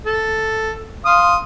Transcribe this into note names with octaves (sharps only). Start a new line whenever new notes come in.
A4
F5 C6 D#6